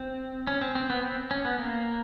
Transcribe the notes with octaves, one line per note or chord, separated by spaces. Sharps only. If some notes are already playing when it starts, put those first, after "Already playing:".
Already playing: C4
C#4
C4
C4
B3
C4
C#4
B3
A#3